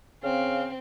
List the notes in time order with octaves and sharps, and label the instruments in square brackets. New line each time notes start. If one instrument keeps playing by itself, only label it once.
[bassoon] C#3 [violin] C4 [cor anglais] F5